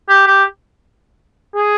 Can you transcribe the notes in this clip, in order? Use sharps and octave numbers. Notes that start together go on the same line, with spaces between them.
G4
G4
G#4